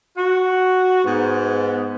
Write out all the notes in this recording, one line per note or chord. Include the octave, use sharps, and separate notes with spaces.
F#4
G#2 B3